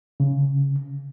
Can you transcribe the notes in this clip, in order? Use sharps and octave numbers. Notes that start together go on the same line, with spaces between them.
C#3